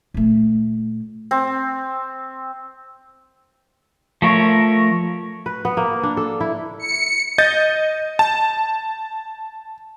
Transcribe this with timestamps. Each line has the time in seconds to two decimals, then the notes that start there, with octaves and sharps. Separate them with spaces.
0.14 A#2 A3
1.31 C4
4.22 F3 A3 A#4 C#5
5.46 B4
5.65 B3
5.77 A#3
6.03 D4
6.17 A4
6.41 E4
6.78 C#7
7.38 D#5 G6 A6
8.19 A5